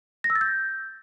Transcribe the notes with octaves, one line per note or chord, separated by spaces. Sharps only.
A#6
E6
A6
G6